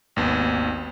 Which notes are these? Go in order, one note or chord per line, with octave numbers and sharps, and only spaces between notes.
G#1 D#2 B3